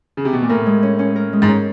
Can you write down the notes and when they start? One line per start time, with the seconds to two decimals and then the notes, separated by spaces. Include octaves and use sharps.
0.17 C#3
0.25 C3
0.33 B2
0.42 A#2
0.49 A2 A#4
0.66 G#3
0.83 C#4
0.99 C#4
1.16 A#4
1.33 G#3
1.42 G#2
1.48 C#4